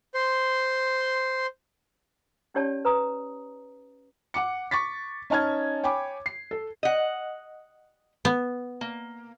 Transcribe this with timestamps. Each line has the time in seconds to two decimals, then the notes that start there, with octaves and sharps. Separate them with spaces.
0.14 C5 C6
2.54 C#4 D#4 G4 C#5 D5 A5
2.85 B4 A#5 D#6
4.34 F#5 D6 C#7
4.71 C#6 D6 A6 B6
5.30 C#4 D#4 A5 F6 G#6
5.84 C#5 G5 G#5 B5 D6
6.26 C7
6.51 A4
6.83 D#5 F#5
8.25 B3
8.81 A#3